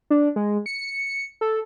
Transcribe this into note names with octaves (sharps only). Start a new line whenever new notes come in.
D4
G#3
C#7
A4